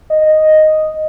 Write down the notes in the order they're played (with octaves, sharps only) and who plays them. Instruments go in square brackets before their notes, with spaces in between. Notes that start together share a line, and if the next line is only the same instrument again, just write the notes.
[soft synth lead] D#5